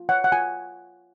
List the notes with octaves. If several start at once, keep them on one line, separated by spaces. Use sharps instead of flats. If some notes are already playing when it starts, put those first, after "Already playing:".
Already playing: F4
C#5 F#5
F#5
F4 G#5